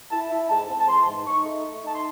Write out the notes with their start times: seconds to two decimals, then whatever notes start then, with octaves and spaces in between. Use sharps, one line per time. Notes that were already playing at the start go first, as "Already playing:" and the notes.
0.11 E4 A5
0.31 E4
0.50 G#2 A5
0.69 C4
0.80 A5
0.88 E3 C6
1.07 G#2
1.26 D#4 C#6
1.46 A3
1.64 A3
1.84 D#4 A5
1.95 C6